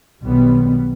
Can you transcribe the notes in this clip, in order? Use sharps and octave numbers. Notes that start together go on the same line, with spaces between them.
B1 D#3 G3 B3